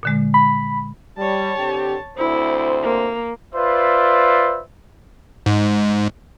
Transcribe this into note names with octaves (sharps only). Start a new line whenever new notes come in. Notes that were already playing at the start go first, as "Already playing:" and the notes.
A#2 D3 G#3
B5
G3 C#5 A5
D3 C4 G4
D2 C4 E4 C5
A#3
F4 B4 C5 D5 E5
G#2